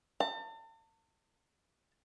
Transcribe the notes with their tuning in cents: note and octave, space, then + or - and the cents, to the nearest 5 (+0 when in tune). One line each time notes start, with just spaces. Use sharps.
A5 +40